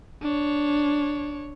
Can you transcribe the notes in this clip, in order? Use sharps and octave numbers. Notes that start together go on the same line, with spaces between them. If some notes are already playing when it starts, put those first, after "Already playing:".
D4 C#5